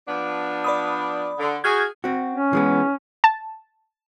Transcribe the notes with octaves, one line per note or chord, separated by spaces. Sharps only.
F3 B3 D4
D5 B5 D#6
D3
F#4 G#4 F6 G6 G#6
C4 F#4
C#4
E3 G#3 B3
A5